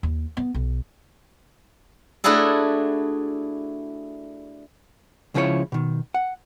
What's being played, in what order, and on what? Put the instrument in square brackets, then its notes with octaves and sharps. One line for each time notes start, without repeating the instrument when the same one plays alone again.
[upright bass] D#2
B3
B1
[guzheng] A3 D4 E4 F#4 G#4 A4
[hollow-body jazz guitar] C#2 C#3 F3 E4 G4 C#5
B2 D#3
F#5